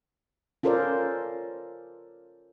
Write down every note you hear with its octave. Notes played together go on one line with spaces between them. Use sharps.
C#4 F4 A4 A#4 C5 D5